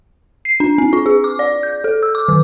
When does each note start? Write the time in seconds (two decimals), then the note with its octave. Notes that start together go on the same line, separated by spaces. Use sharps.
0.45 C7
0.60 D4
0.78 C4
0.93 F4
1.06 G#4
1.24 D6
1.39 D5
1.63 G6
1.84 A4
2.03 E6
2.15 D6
2.28 D#3